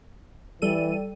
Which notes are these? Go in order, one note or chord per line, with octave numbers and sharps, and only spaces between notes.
E3 G3 A4 D#7